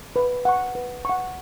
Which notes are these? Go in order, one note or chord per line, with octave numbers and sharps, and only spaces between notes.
B4
F#5 C#6
B4
F#5 C#6